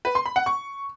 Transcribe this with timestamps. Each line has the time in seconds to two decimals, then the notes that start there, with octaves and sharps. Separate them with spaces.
0.05 B4
0.15 C6
0.26 B5
0.36 F#5
0.46 C#6